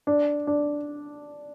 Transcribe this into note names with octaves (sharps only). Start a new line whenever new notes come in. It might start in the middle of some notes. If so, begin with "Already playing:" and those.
D4
D4